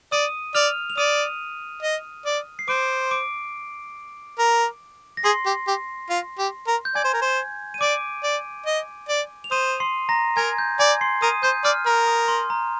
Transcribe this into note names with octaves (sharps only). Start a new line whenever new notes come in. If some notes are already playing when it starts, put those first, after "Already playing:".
D5 D#6 D#7
D5 F6 F7
F7
D5 D#6 D#7
D#5
D5
C7
C5 D6 D7
D6 D7
A#4
A#6
G#4 C6 C7
G4
G4
F4
G4
A#4
G6
D5 G#5 G#6
C5
A#4
C5
D#7
D5 D6 D7
D5
D#5
D5
F7
C5 D#6 D#7
C6 C7
A#5 A#6
A#4 G#5 G#6
G6
D5 G#5 G#6
C6 C7
A#4 D#6 D#7
C5 G6
D5 F6
A#4 F6
D#6
C6
A#5